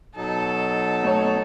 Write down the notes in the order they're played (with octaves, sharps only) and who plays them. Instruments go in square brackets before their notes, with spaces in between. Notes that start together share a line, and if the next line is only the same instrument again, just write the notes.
[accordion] B2 F#3 D#4 [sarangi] A4
[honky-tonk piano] A3 C#5